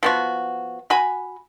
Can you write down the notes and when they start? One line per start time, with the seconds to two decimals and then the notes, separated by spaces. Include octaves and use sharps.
0.03 F3 B3 F#4
0.90 F#4 G#5 B5